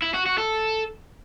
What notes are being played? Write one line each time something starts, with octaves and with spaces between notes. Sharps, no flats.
E4
F#4
F#4
A4